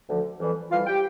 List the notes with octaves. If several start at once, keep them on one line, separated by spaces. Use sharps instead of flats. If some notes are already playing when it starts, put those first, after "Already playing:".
D2 D3 F3
F2 E3 G3
F2 E3 G3 F4 F5
G4 G5